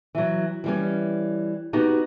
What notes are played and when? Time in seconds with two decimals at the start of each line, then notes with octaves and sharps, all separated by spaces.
0.15 E3 F#3
0.64 E3 G3 C#4
1.73 B3 D#4 F#4 G4